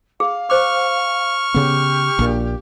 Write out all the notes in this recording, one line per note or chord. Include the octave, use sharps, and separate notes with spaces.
G#4 F5
C5 C#6 D6 F6
C#3 B3 G4
A#1 A#2